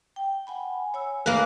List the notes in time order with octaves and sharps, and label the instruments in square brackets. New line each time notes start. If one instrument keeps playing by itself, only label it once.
[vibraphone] G5
F#5 G#5 B5
C#5 G#5 E6
[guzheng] A#3 B4